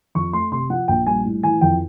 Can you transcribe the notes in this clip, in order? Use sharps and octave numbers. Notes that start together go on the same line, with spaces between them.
F2 C#6
A3 C6
C3 C6
F3 F#5
A#1 G5
G3 G#5
A2
E3 G#5
F2 G5